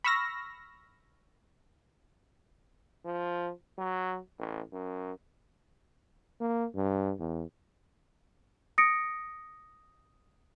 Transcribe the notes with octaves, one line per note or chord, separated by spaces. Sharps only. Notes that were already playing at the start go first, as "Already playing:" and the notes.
B5 C#6 E6 F6 A#6
F3
F#3
A1
F#2
A#3
G2
E2
D#6 A#6 C#7 D7